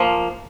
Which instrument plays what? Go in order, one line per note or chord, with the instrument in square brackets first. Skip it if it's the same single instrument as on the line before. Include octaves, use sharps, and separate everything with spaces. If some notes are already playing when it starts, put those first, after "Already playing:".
Already playing: [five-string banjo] F3 A#3